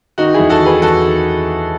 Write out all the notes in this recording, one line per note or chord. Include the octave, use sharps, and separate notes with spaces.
D#3 D#4 F#4
E4 G#4
E2
F#4 A4
D#3
G#4 B4
E2 F#4 A4
D#3